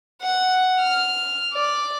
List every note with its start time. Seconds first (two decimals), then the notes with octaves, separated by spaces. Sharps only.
0.22 F#5
0.81 F6
1.54 D5